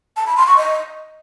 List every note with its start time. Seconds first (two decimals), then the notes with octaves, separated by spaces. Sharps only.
0.17 A5
0.27 B5
0.37 C6
0.47 C#6
0.57 D#5